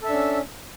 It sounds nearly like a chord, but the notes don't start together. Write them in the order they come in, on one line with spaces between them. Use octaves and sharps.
A4 E5 D4 C#4